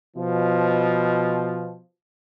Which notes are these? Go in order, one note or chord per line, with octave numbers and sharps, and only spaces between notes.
B2 F3